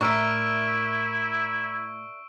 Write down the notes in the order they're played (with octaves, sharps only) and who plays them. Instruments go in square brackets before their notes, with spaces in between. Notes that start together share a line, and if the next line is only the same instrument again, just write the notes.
[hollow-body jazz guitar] A2 [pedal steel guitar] D4 A#4 E5 [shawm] E4 [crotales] C#6 E6 D7